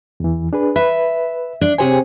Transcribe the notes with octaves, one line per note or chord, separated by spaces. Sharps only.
E2 E3
D4 G#4 B4
B4 E5
D4
C3 G4 G#4 C5 C#5 G#5